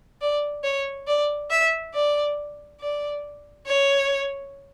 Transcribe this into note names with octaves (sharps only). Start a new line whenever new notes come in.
D5
C#5
D5
E5
D5
D5
C#5